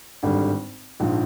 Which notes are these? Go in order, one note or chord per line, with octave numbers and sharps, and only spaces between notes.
G#1 G2 D3 G3
A#1 G#2 F3